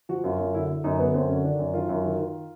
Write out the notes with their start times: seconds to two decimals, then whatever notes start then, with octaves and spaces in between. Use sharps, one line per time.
0.09 F3 F#4
0.24 F#2 F4
0.39 F#2
0.54 D3 E4
0.69 D3
0.84 F#2 D#4
0.99 D3 B3
1.14 F#2 C4
1.29 D3 C#4
1.44 D#3 D4
1.59 F#2
1.74 D#3 F4
1.89 F#2
2.04 D#3
2.19 D#3